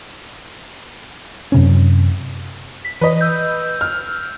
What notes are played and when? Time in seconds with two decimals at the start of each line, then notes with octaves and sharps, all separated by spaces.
1.52 F#2 C3 C#4
2.85 B6
3.01 E3 B4 D#5
3.21 E6 G6
3.81 F6